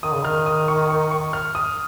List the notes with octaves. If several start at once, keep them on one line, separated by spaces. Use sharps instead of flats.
D#3 D#6
C#3
D#3 F6
D#6
C#6
C#6
C#6
F6
D#6